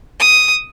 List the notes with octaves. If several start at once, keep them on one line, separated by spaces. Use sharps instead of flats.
D#6